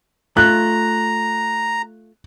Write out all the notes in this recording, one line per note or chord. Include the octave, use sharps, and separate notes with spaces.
A3 F4 A#5 F#6